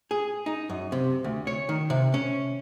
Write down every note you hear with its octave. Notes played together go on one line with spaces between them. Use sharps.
G#4
D#4
F#2
C3
D2
C#5
D#3
C3
C#4